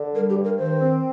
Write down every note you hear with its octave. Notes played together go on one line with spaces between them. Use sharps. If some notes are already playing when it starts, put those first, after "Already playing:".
Already playing: D3
G3 A#4
G4
G2
A#4
D#3 C5
C4